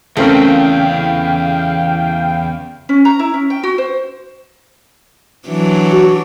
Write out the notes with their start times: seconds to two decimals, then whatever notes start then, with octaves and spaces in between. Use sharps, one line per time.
0.17 E2 C#3 A3 C4 A#4 F5 G5
2.89 C#4
3.05 A#5
3.19 E4
3.34 C#4
3.50 G5
3.64 F#4
3.78 C5
5.48 E3 F#3 D4
5.92 F#4